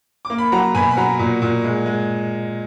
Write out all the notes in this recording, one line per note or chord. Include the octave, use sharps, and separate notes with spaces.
D6
A#3
B5
F#3 F#5 A#5
B2 G#5 B5
B5
F#3 F#5 A#5
A#2
A#2
G#3
G#3